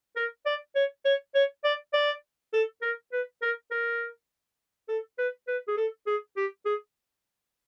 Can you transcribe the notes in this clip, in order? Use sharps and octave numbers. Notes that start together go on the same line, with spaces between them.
A#4
D5
C#5
C#5
C#5
D5
D5
A4
A#4
B4
A#4
A#4
A4
B4
B4
G#4
A4
G#4
G4
G#4